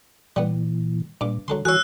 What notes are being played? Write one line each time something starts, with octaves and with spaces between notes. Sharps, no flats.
A#2 E3 G3 B3
G2 A#2 D6
D3 F#3 A4 C6
E3 F#4 G#4 C#5 E6 F#6